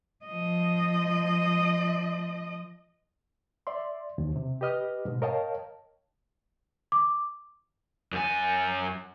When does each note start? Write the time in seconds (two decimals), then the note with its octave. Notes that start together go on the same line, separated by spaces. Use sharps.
0.25 F3 D#5
3.67 D5 E5 C6
4.18 D#2
4.36 C3
4.61 G4 B4 D#5 F6
5.05 G#2 B2
5.22 A#4 C#5 D#5 F5 G5 A5
6.92 D6
8.12 F#2 G#5